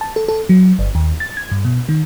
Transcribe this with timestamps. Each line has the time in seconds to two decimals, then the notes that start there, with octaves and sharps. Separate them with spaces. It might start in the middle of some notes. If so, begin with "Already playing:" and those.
0.01 A5
0.16 A4
0.28 A4
0.49 F#3
0.79 G1
0.95 D#2
1.20 A6
1.37 G#6
1.51 G2
1.65 B2
1.89 D#3